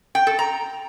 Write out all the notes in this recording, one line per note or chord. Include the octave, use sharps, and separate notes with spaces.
G5
A4
A#5